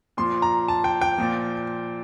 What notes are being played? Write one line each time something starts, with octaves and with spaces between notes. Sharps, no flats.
A#2 F3 C6
A#5
A5
G5
G5
A#2 F3